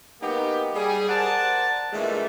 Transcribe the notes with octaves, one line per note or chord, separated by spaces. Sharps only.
F#3 A#3 B3 D#4 G4
G3 G#4
A#4 C5 D5 F#5 A5
A#2 D3 E3 G#3 A3